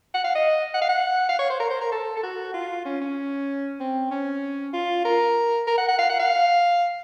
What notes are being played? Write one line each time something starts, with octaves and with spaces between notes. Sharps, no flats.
F#5
F5
D#5
F#5
F5
F#5
F5
C#5
C5
A#4
C5
A#4
A4
A4
F#4
F4
C#4
C#4
C4
C#4
F4
A#4
A#4
F#5
F#5
F5
F#5
F5